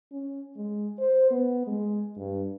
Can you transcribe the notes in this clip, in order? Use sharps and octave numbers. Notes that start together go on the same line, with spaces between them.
C#4
G#3
C5
B3
G#3
G2